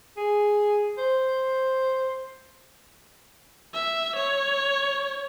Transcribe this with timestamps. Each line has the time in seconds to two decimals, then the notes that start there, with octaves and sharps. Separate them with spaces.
0.17 G#4
0.98 C5
3.74 E5
4.16 C#5